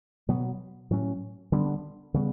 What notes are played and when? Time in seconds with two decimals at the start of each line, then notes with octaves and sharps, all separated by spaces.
0.29 B2 F#3 B3
0.91 A2 F#3 C#4
1.52 D3 G3 B3 D4
2.14 C#3 G3 B3